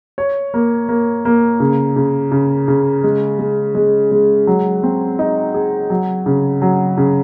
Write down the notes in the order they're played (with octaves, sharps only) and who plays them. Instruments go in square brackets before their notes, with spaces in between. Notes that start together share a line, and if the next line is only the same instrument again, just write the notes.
[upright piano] C#5
A#3
A#3
A#3
C#3
C#3
C#3
C#3
G#3
G#3
G#3
G#3
F#3
C4
D#4
G#4
F#3
C#3
F#3
C#3